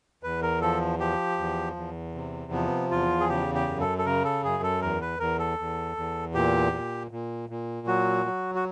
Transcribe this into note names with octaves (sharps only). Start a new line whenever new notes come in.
E2 B4
A#4
F3 A4
F3 G4
E2
E2
C3
F3 B3
E2 F4
G#4
C#3 G4
G4
F#2
A4
A4
C#3 A#4
A4
F#2 G#4
A4
E2 A#4
B4
E2 A#4
A4
E2
E2
A#2 G4
A#2
A#2
A#2
F#3 F#4
F#3
F#4